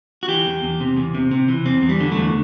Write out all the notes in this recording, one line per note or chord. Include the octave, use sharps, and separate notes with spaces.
F#4
E3 G4
E2
E2
C3
E2
C3
C3
E3
E2 C4
E2
G3
D3
A3
E2